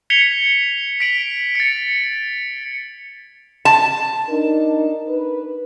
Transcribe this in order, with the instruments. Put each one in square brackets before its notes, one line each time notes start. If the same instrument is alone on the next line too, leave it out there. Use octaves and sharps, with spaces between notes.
[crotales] G#6 B6 C#7 F7 G7
B6 D7 F#7
A6 C#7
[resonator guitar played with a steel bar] A5
[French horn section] D4 D#4 A#4
B4